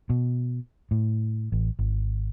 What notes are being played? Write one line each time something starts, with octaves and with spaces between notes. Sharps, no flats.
B2
A2
A1
G#1